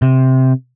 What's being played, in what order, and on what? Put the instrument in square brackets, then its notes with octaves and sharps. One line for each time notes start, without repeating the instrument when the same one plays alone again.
[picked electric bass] C3